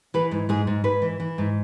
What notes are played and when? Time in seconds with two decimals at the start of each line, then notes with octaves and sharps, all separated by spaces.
0.14 E3 B4
0.31 G#2
0.49 G#2 G#4
0.67 G#2
0.84 G#2 B4
1.02 E3
1.20 E3
1.38 G#2